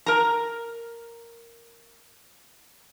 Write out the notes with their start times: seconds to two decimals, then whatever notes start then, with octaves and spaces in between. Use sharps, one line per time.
0.06 A#4 A#5